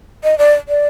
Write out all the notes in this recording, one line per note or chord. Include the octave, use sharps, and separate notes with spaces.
D#5
D5
D5